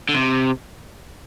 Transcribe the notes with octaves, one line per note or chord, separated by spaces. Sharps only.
D3
C3